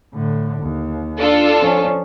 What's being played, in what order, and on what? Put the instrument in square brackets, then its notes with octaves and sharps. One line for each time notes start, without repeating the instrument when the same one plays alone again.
[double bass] A2 D3
D#2
[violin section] D4 F4 A4
[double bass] F3 C#4